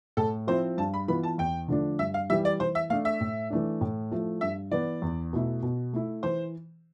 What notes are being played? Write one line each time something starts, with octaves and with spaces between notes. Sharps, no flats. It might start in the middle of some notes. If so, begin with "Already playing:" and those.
A2 A4
F3 C4 E4 C5
G2 A5
B5
E3 B3 F4 B5
A5
E2 G5
D3 F3 A3 D4
G2 E5
F5
E3 G3 E5
D5
E3 C5
E5
A3 D4 F5
E5
A2
E3 A3 D4
A2
F3 A3 E4
G2 E5
E3 B3 D5
E2
B2 A3 E4
B2
A3 E4
E3 C5